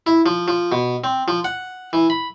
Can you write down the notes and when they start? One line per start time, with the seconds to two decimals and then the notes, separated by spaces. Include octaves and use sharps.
0.07 E4
0.26 F3
0.48 F3
0.72 B2
1.04 C4
1.28 F3
1.44 F#5
1.93 E3
2.10 B5